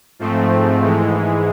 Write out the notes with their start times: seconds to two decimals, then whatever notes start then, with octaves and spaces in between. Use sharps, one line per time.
0.19 G#2 F3 A3 C4
0.82 G#2 E3 G#3